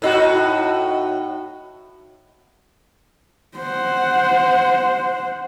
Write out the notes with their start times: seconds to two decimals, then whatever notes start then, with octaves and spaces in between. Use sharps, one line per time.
0.02 A2 D#4 F#4
3.57 C5 F#5